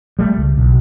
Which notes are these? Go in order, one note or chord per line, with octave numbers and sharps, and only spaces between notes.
G3 A3
C#2
B1